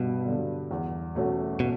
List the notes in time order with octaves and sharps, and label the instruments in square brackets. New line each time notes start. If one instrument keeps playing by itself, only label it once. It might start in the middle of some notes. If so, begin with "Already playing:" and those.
Already playing: [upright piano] G2 [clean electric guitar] B2
[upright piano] D3 F#3
E2
B2 A3 C#4 F#4
[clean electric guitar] B2